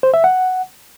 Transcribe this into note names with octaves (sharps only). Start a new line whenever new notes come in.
C5
E5
F#5